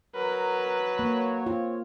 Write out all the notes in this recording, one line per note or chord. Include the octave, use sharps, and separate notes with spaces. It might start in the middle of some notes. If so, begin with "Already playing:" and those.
F#3 A#4 B4
A#3 C#5
C4 F4